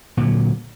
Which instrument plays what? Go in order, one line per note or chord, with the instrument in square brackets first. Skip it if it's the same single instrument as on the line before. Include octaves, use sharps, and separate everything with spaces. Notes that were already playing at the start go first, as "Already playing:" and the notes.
[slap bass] A#2
D3
F#3